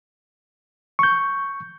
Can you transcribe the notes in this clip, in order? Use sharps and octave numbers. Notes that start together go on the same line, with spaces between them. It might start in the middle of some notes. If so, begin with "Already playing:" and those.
C#6 G6